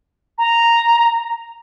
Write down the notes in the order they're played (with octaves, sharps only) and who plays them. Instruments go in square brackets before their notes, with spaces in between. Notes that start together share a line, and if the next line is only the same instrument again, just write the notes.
[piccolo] A#5